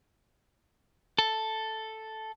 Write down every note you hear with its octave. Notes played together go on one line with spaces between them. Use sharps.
A4